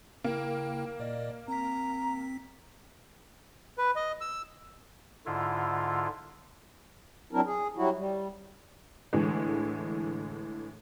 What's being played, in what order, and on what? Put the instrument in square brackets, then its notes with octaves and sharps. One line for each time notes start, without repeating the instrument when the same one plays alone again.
[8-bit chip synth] C#3 E4 G5 [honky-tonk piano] A#3
[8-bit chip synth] A#2 D5 D#5
[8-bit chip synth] C4 B6 [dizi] A#5
[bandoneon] B4
D#5
E6
[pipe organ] G#2 D3 E4 F4
[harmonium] F#3 C4 D4 E4 A#4
G#4
F#3 G3 E4 F#4
G3
[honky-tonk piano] A2 D3 E3 G#3